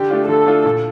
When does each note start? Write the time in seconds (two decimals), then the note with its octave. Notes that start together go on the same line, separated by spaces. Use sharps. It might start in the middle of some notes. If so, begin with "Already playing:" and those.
Already playing: D3 G4
0.10 A3 D4 F4
0.28 D3 A4
0.46 A3 D4 F4
0.65 A#2